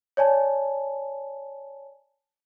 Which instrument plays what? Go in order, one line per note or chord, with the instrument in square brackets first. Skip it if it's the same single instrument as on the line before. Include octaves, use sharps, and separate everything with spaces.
[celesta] C#5 D5 G#5 A5